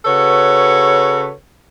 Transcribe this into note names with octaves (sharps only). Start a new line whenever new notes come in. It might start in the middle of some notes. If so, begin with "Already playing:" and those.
C#3 F#4 A4 B4 C#5